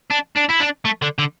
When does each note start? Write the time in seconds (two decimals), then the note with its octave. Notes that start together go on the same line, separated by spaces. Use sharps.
0.10 D4
0.36 D4
0.49 E4
0.60 D4
0.85 A3
1.02 D3
1.19 D3